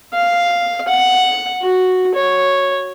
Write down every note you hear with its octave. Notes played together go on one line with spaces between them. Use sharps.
F5
F#5
F#4
C#5